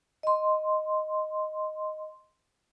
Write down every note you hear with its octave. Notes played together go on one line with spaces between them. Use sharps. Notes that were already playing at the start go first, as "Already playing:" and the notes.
D#5 C6